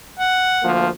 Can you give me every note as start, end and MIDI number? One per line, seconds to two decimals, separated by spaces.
0.19 0.71 78
0.63 0.89 38
0.63 0.89 53
0.63 0.89 58